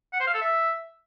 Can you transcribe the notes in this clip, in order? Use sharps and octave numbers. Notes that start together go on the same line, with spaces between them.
F#5
C5
F5
A4
E5